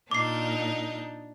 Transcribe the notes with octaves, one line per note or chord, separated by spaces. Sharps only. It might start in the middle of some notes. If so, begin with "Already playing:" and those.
A#2 D4 D#4 D6 G6 C7